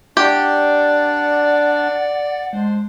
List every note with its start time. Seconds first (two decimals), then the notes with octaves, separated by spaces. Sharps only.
0.17 D4 G4 D5 F#5
2.53 G#3 D4 C5